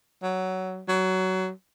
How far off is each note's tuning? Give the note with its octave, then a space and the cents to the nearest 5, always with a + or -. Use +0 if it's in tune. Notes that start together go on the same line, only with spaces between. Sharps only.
F#3 +15
F#3 +20